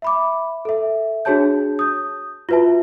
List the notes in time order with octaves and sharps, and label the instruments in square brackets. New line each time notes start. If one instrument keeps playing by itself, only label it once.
[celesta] E5 B5 D6
A4 E5
D4 F#4 G#4 C#5 A5 G6
D#6 G6
F4 F#4 B4 E5 A5